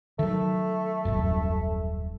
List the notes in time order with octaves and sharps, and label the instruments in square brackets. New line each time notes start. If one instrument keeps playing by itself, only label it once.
[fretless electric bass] D#3 F#3 [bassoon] A3
[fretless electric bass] D#1 A1 F#2